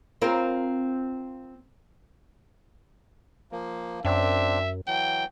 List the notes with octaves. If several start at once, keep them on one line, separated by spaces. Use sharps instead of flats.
C4 F4 A#4
F3 A#3
F#2 C4 D4 E5
E3 F#3 G5